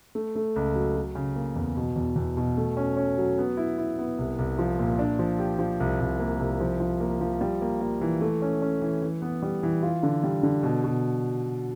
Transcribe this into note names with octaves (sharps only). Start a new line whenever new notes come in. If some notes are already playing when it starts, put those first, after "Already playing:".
A3
A3
C#2
F#3
F#3
C#3
A#3
E2
B2
E2
E2
B2
A3
C#4
C#4
F#3
B3
E4
E4
B3
C2
C2
F3
A#2
D4
F3
G4
F3
C2
C2
A#3
C2
F3
F3
A#3
F3
G3
A#3
A#3
E3
A3
C#4
C#4
E3
E3
B3
G3
E3
F4
D3
G3
D3
B2
B2